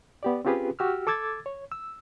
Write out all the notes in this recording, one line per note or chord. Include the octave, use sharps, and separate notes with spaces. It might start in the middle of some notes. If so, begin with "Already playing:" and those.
B3 G4 D5
C4 C#4 F4 G4 G#4 B4
F#4 G4 E6 F6
A4 D6 E6 G#6 A6
C#5
E6